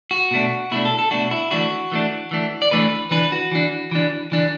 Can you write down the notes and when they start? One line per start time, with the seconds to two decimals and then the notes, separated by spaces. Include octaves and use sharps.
0.11 F#4
0.31 B2 A3 D4
0.71 B2 A3 D4 E4
0.85 A4
0.99 A4
1.11 B2 A3 D4 F#4
1.31 E4
1.51 E3 A3 D4 F#4
1.92 E3 A3 D4
2.31 E3 A3 D4
2.62 D5
2.71 E3 A3 D4 B4
3.11 E3 D4 B4
3.32 F#4
3.52 E3 D4
3.91 E3 D4
4.32 E3 D4